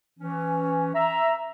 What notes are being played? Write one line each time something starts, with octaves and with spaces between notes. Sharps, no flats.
E3 C#4
E5 A#5